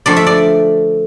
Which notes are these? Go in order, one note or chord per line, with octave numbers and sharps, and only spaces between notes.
D3 F3 A3 D5
E5
D5